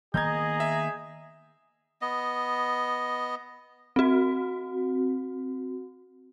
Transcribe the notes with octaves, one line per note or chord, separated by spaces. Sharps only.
D#3 A#3 B3 G#4 D#5 A#5 G6 G#6
E5
B3 D#5
C4 F#4